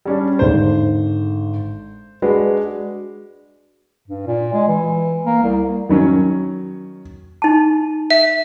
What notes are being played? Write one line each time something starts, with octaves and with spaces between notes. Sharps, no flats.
G3 C#4 D4
G#1 D3 C5
G#3 D4 F#4 B4
G2
A#2
G#3
E3
A#3
C2
D#3 F#3 C#4
D#4 A5
E5